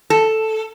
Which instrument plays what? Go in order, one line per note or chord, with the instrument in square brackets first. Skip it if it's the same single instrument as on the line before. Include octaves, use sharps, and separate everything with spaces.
[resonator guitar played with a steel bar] A4